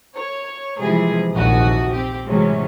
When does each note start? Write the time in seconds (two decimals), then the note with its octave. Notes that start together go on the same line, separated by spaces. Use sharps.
0.16 C#5
0.81 C3 E3 F3 G3 G#3 G#4
1.32 A#1 D#2 C3 F#4 D#6
1.91 C4 G4
2.26 A2 C3 E3 F#3 G#3 C#4